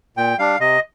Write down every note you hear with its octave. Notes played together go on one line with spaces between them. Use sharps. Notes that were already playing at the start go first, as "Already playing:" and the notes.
A#2 G5
G3 D4 F5
C3 D#5